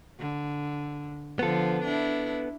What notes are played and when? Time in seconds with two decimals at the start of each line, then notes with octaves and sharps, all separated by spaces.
0.19 D3
1.39 D3 F3 B3 A4
1.84 D4 E4